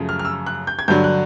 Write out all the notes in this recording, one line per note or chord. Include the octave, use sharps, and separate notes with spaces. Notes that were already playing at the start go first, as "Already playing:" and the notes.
Already playing: F#2 C#3 F3 A3
F6
F6
E6
F#6
G6
G#6
G2 D3 F#3 G6
F#6